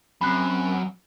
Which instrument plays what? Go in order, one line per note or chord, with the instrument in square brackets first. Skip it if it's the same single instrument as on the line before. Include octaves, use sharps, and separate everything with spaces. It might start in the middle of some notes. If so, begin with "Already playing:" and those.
[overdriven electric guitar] F#2 [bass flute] C4 [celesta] B5 F#6